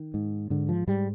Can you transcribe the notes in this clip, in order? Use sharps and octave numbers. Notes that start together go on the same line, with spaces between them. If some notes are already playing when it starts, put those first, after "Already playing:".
Already playing: D#3
G#2
G#2 D3
F3
G#2 G3